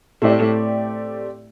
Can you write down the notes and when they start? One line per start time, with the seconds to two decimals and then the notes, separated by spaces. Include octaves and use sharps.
0.22 A2 A3 C4 G4 D5